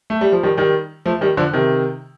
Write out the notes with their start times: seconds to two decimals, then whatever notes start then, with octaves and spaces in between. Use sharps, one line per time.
0.10 A3
0.21 G3
0.32 F3
0.43 D#3 G3
0.57 D#3 G3
1.06 F3 A3
1.21 D#3 G3
1.37 D3 F3
1.53 C3 D#3